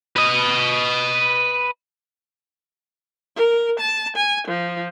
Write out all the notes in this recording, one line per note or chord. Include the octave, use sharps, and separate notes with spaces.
B4 D#5
A#4
A5
G#5
F3